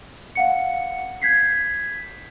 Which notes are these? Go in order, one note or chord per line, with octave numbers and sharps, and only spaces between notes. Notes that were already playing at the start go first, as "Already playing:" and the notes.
F5 F#5 C#7
G6 G#6 B6 C7